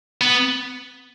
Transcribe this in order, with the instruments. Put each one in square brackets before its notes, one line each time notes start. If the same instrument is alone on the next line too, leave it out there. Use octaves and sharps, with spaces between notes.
[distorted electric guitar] B3